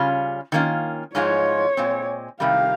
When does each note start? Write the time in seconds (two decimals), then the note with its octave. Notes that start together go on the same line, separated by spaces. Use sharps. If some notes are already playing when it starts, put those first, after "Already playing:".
Already playing: C#3 G3 C#4 F4
0.52 D#3 A#3 C#4 F4
1.15 G#2 F3 G#3 F4 C#5
1.77 A#2 G#3 C4
2.40 C3 D#3 G3 F5